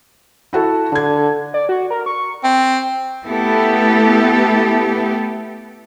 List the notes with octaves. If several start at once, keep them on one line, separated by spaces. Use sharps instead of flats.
E4 F#4 A4
D3 D4 G#6
D5
F#4
A#4
C#6
C4
A3 B3 E4 G4 A4